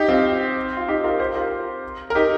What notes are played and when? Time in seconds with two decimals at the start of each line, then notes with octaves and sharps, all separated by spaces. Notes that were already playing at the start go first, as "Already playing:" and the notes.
Already playing: D#4 G4
0.09 C4 F4
0.77 F4
0.88 D#4 G4
1.04 F4 A#4
1.20 G4 C5
1.36 F4 A#4
2.10 A#4
2.15 D#4 G4